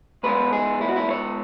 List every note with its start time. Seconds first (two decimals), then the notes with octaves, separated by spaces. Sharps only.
0.23 G#2 G#3 B3 B4
0.53 G#4
0.81 E4
0.88 F#4
0.96 E4
1.10 C#5